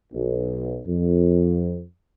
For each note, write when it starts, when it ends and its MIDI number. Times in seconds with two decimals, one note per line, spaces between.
0.13 0.81 35
0.86 1.82 41